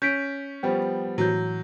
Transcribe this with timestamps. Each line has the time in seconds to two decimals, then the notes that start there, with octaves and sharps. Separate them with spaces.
0.02 C#4 G6 B6 D7
0.63 F3 G3 B3 G5
1.18 A2 E3 F#3 G6